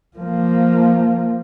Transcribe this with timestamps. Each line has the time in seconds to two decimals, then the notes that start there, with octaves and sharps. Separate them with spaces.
0.17 F3 A#3